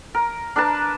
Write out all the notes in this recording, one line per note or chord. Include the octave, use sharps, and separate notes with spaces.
A#4
D4 A#4 B4 A5